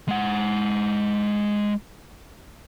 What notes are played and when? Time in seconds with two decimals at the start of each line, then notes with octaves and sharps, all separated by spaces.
0.08 G#3 F#5